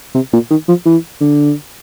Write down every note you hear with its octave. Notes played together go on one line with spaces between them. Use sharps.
C3
A#2
D#3
F3
E3
D3